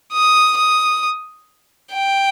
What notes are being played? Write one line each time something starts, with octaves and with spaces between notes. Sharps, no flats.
D#6
D#6
G5